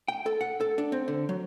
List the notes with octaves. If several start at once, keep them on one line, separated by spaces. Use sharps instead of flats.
G5
A4
F#5
A4
D4
C4
D3
F#3